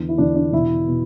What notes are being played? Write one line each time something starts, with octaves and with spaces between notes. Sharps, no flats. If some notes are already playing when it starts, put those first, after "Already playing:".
Already playing: E2 D3
E4
E2 D3 D4
D4
E2 B2 E4
B2